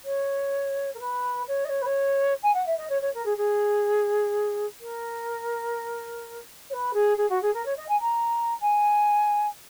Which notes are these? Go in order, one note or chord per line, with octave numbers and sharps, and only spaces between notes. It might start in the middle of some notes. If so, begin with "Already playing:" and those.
C#5
A#4
B4
C#5
D#5
C#5
B4
C#5
G#5
F#5
E5
D#5
C#5
C#5
A#4
G#4
G#4
A#4
C#5
B4
G#4
G#4
F#4
G#4
A#4
C#5
D#5
G#5
A#5
G#5